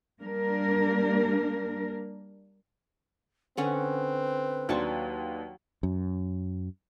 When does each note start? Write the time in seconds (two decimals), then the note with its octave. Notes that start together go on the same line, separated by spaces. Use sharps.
0.21 G3 A#3 D4 A#4
3.57 D3 C4 C#4 B4 F#5
4.69 D#2 F#3 D4 A5 C6 C#6
5.83 F#2